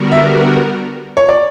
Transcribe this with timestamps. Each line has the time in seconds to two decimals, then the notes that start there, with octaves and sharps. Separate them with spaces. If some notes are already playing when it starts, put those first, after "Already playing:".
Already playing: D3 G3 B3 F#4 A#4
0.12 E5
1.17 C#5
1.29 D5